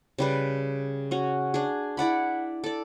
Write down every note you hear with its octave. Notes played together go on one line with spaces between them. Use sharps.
C#3 G3 B4
C#4 F#4
D4 G#4
E4 D5 F#5 B5
A4 D5